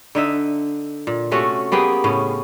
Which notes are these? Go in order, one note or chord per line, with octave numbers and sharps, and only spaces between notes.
D3 D#4 E5
A#2
C3 A3 C#4 F#4
A#3 B3 G4 G#4
A2 C#3 C#4